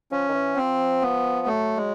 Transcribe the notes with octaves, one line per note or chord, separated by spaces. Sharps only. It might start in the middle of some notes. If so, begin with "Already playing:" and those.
F3 C#4
D#3
E3
F3 C4
B3
F#3 A3
G#3